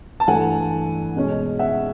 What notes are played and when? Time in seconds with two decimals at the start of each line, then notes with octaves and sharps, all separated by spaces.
0.20 A5
0.27 G2 E3 A3 F#5 G#5
1.16 B2 G#3 C#4
1.59 E5 F#5